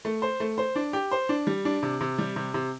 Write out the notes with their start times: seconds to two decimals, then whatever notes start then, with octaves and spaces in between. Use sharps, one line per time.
0.05 A3
0.22 C5
0.40 A3
0.58 C5
0.76 D4
0.93 G4
1.11 C5
1.29 D4
1.47 G3
1.65 D4
1.83 C3
2.01 C3
2.18 G3
2.36 C3
2.54 C3